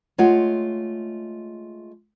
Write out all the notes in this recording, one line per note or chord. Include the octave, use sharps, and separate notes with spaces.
G#3 A3 F4 C#5 F#5